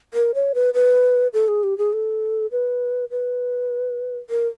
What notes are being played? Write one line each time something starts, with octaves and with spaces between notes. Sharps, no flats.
A#4
C#5
B4
B4
A4
G#4
G4
G#4
A4
B4
B4
A#4